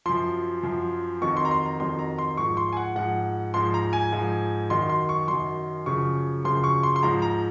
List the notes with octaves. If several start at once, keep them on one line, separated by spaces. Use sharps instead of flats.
F#2 F3 C6
F#2 F3
F2 D#3 F#3 C#6
C6
A#5
C6
A#5
F2 D#3 F#3 C6
A#5
C6
G#2 F3 C#6
C6
G#5
F#5
G#2 F3 F#5
G#2 F3 C6
A#5
G#5
G#2 F3
F#2 D#3 F#3 C6
C6
C#6
F#2 D#3 F#3 C6
F#2 C#3 F3 C#6
F#2 C#3 F3 C6
C#6
C6
C6
G#2 F3 A#5
A#5